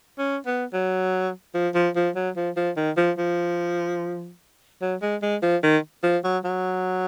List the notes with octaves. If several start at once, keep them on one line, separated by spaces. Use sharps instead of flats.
C#4
B3
F#3
F3
F3
F3
F#3
F3
F3
D#3
F3
F3
F#3
G#3
G#3
F3
D#3
F3
F#3
F#3